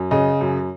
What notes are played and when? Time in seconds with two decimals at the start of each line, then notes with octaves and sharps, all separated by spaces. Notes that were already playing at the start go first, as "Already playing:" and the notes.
Already playing: F#2
0.11 C#3 D#5
0.41 F#2